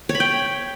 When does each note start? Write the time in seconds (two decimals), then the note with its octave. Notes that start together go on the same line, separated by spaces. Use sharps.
0.09 C#5
0.15 B5
0.20 G5